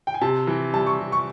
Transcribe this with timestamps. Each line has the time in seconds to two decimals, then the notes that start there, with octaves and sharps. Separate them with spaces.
0.07 G5
0.14 G#5
0.21 C3 A5
0.47 E3
0.73 G3 A5
0.86 C#6
0.99 C3
1.12 C#6